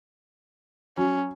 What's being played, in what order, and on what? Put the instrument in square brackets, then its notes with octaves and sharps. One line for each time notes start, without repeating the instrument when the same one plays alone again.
[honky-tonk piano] F#3 [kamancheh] C#4